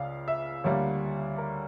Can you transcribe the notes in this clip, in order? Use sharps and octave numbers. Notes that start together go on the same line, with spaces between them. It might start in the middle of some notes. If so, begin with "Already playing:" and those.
Already playing: C#2 C#3 D5 F5
E5
D2 D3 G3 A#3 D4 C#5
A#4